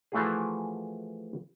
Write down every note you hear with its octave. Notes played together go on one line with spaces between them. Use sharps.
E3 F3 A3 E4 F#4 G#4